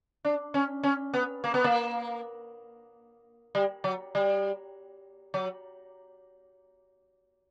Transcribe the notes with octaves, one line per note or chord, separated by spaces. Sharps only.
D4
C#4
C#4
B3
A#3
B3
A#3
G3
F#3
G3
F#3